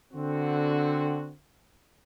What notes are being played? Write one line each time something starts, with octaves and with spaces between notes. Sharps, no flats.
D3 C4 F#4